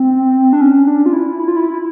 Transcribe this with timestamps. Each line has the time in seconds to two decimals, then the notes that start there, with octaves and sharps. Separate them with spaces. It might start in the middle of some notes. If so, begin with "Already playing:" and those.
Already playing: C4
0.53 D4
0.61 C#4
0.87 D4
1.06 F4
1.13 E4
1.39 E4
1.48 F4
1.56 E4
1.73 E4